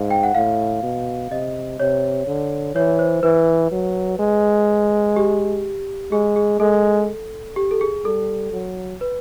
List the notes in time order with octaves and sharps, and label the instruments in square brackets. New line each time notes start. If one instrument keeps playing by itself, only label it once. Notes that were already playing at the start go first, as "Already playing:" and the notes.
Already playing: [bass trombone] G#2 [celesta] F5
[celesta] G5
F#5
[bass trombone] A2 [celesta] F5
[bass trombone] B2
[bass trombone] C3 [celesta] D#5
[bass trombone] C3 [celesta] C#5
[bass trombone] D3
[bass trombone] E3 [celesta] C#5
[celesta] C5
[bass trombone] E3 [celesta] B4
[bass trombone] F#3
G#3
[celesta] G4
[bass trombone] G#3 [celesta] G#4
[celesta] G#4
[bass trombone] G#3 [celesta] A4
[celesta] G4
A4
G#4
[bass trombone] G3 [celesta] A4
[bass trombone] F#3
[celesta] B4